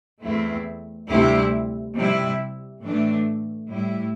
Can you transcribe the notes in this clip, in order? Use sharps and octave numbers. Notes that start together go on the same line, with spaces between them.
E2 E3 A3 C4 E4
D2 C3 G3 C4 E4
C3 G3 E4
A2 E3 A3 D4
A2 G3 E4